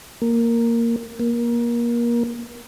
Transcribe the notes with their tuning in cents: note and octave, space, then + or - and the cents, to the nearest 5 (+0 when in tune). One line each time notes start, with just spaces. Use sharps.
A#3 -5
A#3 +25